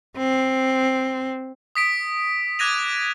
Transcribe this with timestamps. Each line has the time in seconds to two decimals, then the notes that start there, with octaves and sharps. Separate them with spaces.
0.17 C4
1.75 D#6 B6 D7
2.59 D6 F#6 G#6 A#6 D#7 F7